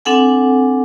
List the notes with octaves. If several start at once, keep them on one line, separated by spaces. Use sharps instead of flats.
C4 D4 A4 F#5 G#5